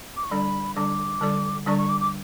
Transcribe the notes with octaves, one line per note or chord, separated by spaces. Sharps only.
D6
C#6
D3 G3 D4 A4 D5 B5
D3 G3 D4 A4 D5 D6
D3 G3 D4 A4 D5
D3 G3 D4 A4 D5 C#6
C#6
D6
D6